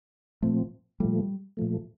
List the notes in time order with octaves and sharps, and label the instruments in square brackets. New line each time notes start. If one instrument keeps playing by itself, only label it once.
[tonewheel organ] A#2 F3 C4 [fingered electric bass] A3
[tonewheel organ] A#2 F3 A3 [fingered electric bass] G3
[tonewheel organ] A#2 F3 A3